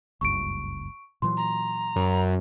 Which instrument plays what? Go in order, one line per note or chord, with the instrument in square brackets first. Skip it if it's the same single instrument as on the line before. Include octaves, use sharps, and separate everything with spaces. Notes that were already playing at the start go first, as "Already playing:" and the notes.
[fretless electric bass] F#1 C#2 G2 [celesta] C#6 D7
[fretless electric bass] A#2 E3 F#3 [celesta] C6
[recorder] A#5
[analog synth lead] F#2